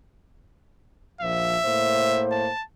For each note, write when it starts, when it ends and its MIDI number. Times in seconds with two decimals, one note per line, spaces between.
1.21 1.57 34
1.21 1.57 53
1.21 2.24 76
1.64 2.48 45
1.64 2.48 58
1.64 2.48 72
2.32 2.63 81